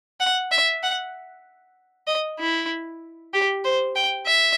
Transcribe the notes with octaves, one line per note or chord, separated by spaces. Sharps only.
F#5
E5
F#5
D#5
E4
G4
C5
G5
E5